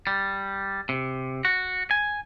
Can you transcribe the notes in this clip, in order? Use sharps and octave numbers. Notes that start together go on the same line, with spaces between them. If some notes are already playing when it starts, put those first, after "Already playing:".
G3
C3
F#4
G#5